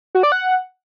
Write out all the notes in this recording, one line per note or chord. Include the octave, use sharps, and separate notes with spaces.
F#4
D5
F#5